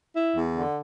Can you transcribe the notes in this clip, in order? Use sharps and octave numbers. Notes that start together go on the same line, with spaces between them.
E4
E2
D3